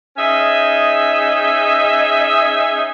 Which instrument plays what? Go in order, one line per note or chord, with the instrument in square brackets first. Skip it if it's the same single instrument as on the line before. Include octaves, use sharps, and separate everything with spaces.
[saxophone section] C#4 D#4 G#4 D#5 E5